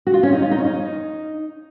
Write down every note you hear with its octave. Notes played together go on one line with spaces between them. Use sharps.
F#4
F4
C#4
D#4
F4
D#4
C#4
D#4